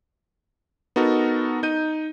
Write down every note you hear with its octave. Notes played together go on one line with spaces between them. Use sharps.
B3 D#4 F#4 A4 A#4
D#4 G6 D#7